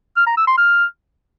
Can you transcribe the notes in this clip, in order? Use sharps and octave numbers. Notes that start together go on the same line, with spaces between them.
F6
A#5
E6
C6
F6